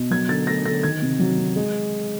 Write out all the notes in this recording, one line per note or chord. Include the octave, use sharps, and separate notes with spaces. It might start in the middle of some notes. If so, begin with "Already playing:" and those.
Already playing: B2
F#3 G#6
D3 A6
A3 A#6
D3 A#6
D#3 G#6
C3
F#3
C3
G#3